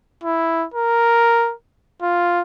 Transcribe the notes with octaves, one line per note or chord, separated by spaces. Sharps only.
E4
A#4
F4